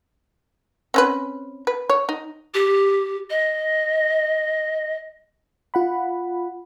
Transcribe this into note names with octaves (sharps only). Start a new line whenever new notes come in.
C4 C#4 B4
B4
C#5
D#4
G4
D#5
F4 F#5 B5